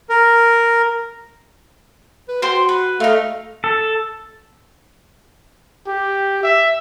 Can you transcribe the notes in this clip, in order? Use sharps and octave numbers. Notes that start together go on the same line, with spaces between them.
A#4
B4
F#4 C5 G5 C6
B4
A3 D#4 F5
A4
G4
E5